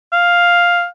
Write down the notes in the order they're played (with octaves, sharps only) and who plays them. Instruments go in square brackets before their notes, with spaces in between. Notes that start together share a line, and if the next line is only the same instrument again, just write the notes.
[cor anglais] F5